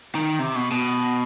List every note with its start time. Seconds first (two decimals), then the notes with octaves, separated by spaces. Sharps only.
0.15 D#3
0.39 C3
0.56 B2
0.72 B2